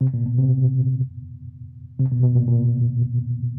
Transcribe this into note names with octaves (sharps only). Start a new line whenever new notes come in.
C3
A#2
B2
C3
C3
B2
B2
A#2
A#2